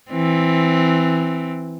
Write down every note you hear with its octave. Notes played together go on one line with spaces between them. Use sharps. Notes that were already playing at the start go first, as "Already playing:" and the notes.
E3 C4